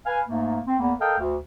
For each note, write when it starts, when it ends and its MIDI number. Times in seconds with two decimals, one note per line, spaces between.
0.06 0.20 71
0.06 0.20 77
0.06 0.20 80
0.27 0.60 44
0.27 0.60 57
0.27 0.60 58
0.66 0.76 60
0.79 0.93 40
0.79 0.93 58
0.79 0.93 59
1.00 1.15 69
1.00 1.15 70
1.00 1.15 75
1.00 1.15 77
1.00 1.15 79
1.18 1.37 38